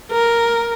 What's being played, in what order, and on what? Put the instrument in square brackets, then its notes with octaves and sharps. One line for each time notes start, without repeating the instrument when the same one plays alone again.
[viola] A#4